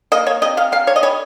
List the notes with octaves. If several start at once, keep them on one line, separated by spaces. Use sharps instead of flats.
A#3 D#5
A#3 C#5
C3 D#5
C3 F5
C3 F5
C3 C#5
D#5
G3 C#5